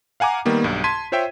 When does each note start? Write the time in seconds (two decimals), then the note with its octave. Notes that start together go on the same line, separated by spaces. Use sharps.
0.20 F5 F#5 G#5 A#5 D6
0.45 D#3 G3 A#3 B3
0.64 B1 G2
0.84 A5 C6 G#6 B6 D#7
1.12 F4 C5 C#5 E5 G5